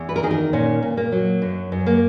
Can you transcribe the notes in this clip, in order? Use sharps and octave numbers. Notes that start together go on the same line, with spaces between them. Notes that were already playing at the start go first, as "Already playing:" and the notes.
Already playing: E2
B4
A#4
D#3 G#4
A#4
A#2 C#4
A#2
A#3
F#3
F#2
F#2
A#3